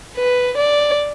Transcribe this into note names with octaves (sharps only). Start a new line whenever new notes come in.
B4
D5